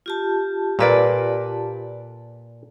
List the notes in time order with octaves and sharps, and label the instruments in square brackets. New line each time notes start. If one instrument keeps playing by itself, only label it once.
[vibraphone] F4 G4 A5
[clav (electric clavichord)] A#2 A#3 [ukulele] A4 B4 D5